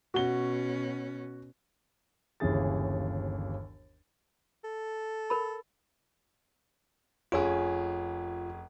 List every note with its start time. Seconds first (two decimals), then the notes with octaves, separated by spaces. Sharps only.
0.14 B2 C#4 F#4 G7
2.40 G1 D#2 C#3 E3 G#4 A6
4.64 A4
5.30 A#4 B5
7.32 F1 C#4 F4 G#4